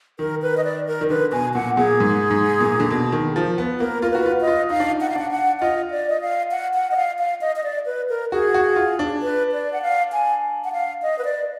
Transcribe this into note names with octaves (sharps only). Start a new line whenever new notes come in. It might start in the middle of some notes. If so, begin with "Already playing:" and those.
D#3 A#4
B4
D#5
D5
A#4
D#3
D3 B4
B2 G#5
A#2 F#5
A#2 G#4
G#2
G#2
A#2
D3
B2
D#3
F3
B3
A#3 A#4
F4 A#4
F#4 B4
F4
D#5
F4
D#4 F5
D4
D#4
F#5
F5
D4 F#5
F#5
F4 D#5
D5
D#5
F5
F#5
F#5
D#5
F5
F5
D#5
D#5
D5
B4
A#4
F#4 G#4
F#4
F4
D4
B4
D5
F#5
F5
G#5
F#5
F5
D#5
B4
D5